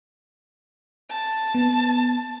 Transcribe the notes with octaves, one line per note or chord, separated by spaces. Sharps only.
A5
B3